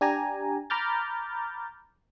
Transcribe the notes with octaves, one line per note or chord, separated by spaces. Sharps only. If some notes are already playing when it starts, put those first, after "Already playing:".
D4 G4 G#5 A#5
A#5 B5 D6 F6 G6 A6